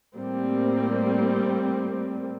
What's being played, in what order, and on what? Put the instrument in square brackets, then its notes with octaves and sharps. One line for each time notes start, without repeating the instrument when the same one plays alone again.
[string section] A2 G3 A#3 C4